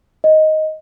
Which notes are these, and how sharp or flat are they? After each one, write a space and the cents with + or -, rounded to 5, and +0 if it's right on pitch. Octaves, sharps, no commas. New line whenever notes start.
D#5 +5